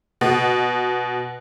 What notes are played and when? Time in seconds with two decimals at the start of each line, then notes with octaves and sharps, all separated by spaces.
0.21 B2